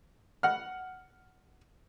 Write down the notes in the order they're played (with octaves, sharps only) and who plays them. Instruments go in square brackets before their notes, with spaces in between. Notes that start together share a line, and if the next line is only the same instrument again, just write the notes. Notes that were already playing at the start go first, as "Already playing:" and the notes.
[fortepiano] F#5 F6